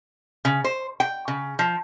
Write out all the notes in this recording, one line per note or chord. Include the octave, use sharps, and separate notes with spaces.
C#3
C5
G5
C#3
F3